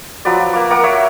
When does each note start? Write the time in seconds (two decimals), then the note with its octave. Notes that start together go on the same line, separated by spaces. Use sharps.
0.25 F3 F#3 B4 D5
0.53 A#3 D6
0.71 A#4 F#5 D6
0.83 C#5 E5